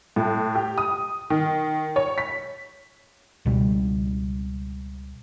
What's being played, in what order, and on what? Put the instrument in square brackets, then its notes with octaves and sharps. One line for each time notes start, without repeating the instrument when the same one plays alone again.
[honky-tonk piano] A2
G4
D#6
D#3
C#5
B6
[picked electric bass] C#2 B2 G3